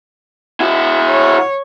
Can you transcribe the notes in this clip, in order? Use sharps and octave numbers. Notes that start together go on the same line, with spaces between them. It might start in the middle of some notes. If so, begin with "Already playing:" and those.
E4 F#4
C#5